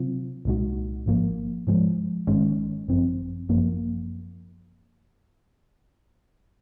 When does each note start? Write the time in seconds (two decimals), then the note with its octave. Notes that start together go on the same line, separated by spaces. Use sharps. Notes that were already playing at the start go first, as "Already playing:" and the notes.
Already playing: C3 F#3 C4 F4
0.45 C2 A#2 G#3 D#4 F#4
1.06 G#1 G#2 F3 A#3
1.67 G#2 F3 G#3
2.27 G#1 G#2 D#3 G#3 C#4
2.88 G#1 F#2 F3 C4
3.49 G#1 F#2 F3 A#3